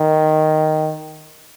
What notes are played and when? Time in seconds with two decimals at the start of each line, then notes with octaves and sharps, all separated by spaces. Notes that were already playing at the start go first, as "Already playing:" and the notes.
Already playing: D#3